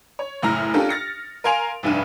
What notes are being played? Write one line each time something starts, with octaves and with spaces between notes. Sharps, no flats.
C#5
F#1 A2 A#5 F6 A#6
C#4 D4 F4 G4 A4 A#4
F6 A6 A#6 C#7
A#4 F5 G#5 C6 D7 F7
F1 C2 G2 D4 D#7